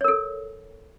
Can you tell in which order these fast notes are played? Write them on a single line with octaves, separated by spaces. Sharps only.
C#5 A#4 A4